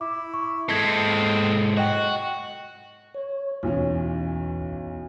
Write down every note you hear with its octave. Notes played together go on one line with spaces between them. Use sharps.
E4 D6
C#6
G#2 G#3 B3 C4 A4 G#6 B6 C7
F#4 D#5 F#5 G5
C#5
B1 E2 E3 C#4